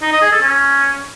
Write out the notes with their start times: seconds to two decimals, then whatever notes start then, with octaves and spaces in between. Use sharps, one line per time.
0.02 D#4
0.12 D#5
0.22 G#4
0.32 A4
0.42 C#4